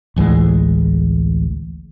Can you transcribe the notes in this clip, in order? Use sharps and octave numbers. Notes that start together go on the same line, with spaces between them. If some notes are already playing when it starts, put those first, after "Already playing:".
A1 D2 E3 G#3